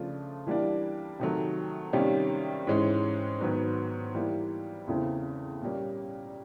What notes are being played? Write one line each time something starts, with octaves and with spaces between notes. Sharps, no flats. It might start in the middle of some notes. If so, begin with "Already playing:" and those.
Already playing: C#3 F3 A3 D4 F4
E3 G3 A#3 D4
C3 D#3 F#3 A3
C3 D#3 G3 A#3 C#4
G#2 E3 G#3 C#4
G#2 D#3 F#3 B3
E3 G3 A#3
E2 C#3 E3 A3 C4
A#2 G3 A#3 C#4